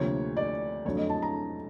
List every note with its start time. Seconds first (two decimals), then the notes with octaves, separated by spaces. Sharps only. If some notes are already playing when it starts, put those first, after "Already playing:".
Already playing: D2 C3 F3 A#3 C#5
0.37 D5
0.85 F2 D3 F#3 A3 C#5
0.97 D#5
1.09 A5
1.22 A#5